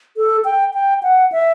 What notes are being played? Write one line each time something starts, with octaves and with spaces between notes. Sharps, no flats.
A4
G5
G5
F#5
E5